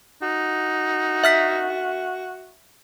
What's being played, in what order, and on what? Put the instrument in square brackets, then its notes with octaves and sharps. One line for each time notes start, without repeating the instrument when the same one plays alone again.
[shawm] D#4 [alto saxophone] F#4
[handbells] E5 F6 B6